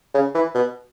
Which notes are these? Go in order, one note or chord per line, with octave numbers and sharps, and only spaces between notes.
C#3
E3
B2